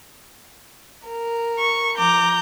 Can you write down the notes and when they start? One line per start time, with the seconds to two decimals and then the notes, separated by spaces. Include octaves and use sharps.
1.08 A#4
1.59 C#6
1.98 F3 A#5 D6 G6